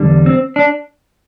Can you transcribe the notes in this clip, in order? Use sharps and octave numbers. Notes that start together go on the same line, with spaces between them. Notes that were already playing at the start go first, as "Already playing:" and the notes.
Already playing: E2 D3 G3
C4
D4